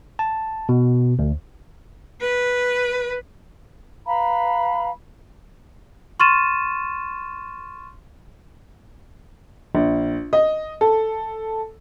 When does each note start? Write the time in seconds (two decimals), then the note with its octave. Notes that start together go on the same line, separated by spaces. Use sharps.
0.19 A5
0.69 B2
1.19 D2
2.21 B4
4.06 B4 F5 A#5 B5
6.20 C6 C#6 F6 A6 D#7 E7
9.75 A#1
10.33 D#5
10.81 A4